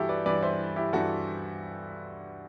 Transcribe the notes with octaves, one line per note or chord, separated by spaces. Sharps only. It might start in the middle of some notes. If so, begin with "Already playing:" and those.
Already playing: G2 E3 E4 F#4 G4 A4
B4 D5
G2 E3 B4 D5
C5 E5
E4 G4
G2 E3 F#4 A4